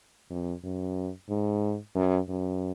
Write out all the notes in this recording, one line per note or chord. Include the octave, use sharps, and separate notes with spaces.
F2
F#2
G#2
F#2
F#2